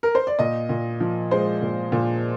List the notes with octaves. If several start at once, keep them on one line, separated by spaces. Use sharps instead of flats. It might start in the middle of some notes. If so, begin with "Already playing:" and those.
A#4
C5
D5
A#2 D#5
A#2
F3
G#3 C5
A#2
A#2